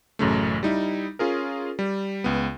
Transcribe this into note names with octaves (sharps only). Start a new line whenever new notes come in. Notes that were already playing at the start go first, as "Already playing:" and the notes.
A1 F#2 C#3 A3
G3 D#4 E4
C#4 F4 G#4 A#4
G3
C#2 B3